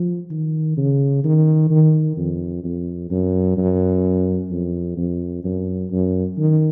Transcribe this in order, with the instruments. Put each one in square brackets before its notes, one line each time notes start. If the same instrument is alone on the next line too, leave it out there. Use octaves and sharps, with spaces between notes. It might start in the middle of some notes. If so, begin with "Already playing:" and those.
Already playing: [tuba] F3
D#3
C#3
D#3
D#3
F2
F2
F#2
F#2
F2
F2
F#2
F#2
D#3